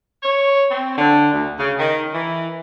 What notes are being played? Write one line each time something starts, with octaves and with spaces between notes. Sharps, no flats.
C#5
C4
D3
D2
C#3
D#3
E3